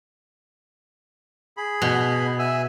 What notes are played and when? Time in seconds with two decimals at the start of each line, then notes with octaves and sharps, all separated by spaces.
1.57 G#4 B5
1.82 B2
2.39 E5 G#5 E6